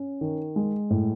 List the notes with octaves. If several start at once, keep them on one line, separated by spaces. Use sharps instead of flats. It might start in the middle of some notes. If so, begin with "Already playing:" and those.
Already playing: C#4
D#3
G#3
A2